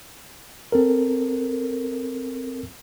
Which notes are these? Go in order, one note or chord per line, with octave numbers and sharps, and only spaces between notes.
C4 A4 A#4